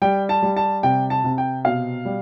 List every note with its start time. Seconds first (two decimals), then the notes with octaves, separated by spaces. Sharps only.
0.02 G3 G5
0.29 A5
0.43 G3
0.57 A5
0.83 C3 G5
1.10 A5
1.24 C3
1.38 G5
1.65 B2 F5
2.05 G3